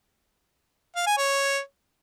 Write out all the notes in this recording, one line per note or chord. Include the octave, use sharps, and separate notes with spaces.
F5
G#5
C#5